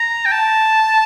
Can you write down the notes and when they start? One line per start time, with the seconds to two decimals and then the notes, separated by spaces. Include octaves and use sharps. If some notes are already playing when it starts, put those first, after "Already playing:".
Already playing: A#5
0.26 G5
0.32 A5